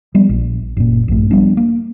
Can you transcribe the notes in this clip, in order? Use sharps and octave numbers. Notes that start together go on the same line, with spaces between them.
F3 G3 B3
A#1
F#1 A#2
A#1 G2 A3
F3 G3 B3 D4
A#3